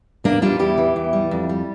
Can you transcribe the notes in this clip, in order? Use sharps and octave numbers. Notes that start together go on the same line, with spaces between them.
E2 A#3 D4
G3 D4 F4
E2 E4 G4
E3
E2
G3
F2
G3